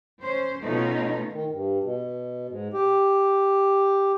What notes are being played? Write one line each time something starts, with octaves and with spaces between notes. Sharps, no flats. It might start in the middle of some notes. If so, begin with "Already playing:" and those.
C#4 C5
B2 A3 B3 C#4 D#4 F4
D#3
G2
B2
G#2
G4